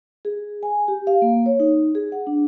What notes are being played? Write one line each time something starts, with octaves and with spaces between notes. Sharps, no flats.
G#4
G#5
G4
F5
A#3
C#5
D#4
G#4
F#5
D4